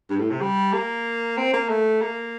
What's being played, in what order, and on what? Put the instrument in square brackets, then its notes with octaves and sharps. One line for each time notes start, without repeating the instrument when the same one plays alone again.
[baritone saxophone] G2
A2
C3
G3
A#3
C4
A#3
A3
A#3